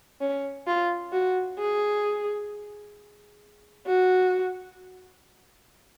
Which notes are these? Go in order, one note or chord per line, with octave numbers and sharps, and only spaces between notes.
C#4
F4
F#4
G#4
F#4